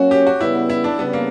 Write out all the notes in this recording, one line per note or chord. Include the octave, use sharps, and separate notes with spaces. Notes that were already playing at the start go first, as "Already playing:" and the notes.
Already playing: F#3 A#3 C#4 F#4
G4
F#4
C#3 G3 B3 E4
E4
D4
C#3 G3 B3
A#3